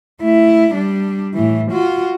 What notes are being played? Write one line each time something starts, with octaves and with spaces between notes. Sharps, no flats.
A3 E4
G3 D4
A2 E3
F4 F#4